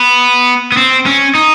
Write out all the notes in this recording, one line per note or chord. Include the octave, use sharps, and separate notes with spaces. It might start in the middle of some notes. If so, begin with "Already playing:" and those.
Already playing: B3
B3
C4
C#4
D#4